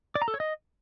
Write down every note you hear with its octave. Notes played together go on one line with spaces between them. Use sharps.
D5
A#5
A4
C#5
D#5